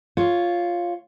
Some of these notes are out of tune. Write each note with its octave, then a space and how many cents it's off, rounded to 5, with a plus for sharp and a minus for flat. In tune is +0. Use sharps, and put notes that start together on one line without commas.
F4 +0 C#5 +0